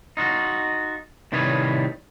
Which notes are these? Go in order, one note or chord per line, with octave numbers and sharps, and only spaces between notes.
D#4 F4 F#4
A2 C3 D#3 G3 B4 C#5